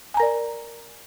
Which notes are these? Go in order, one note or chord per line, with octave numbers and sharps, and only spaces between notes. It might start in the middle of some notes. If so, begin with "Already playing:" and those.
A#4 D5 G#5 A#5